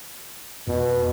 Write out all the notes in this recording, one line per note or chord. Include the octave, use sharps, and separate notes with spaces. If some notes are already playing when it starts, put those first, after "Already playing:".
F2 B2